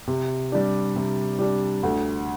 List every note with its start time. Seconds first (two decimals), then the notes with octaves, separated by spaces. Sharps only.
0.07 C3
0.52 G3 D4
0.96 C3
1.39 G3 D4
1.83 D2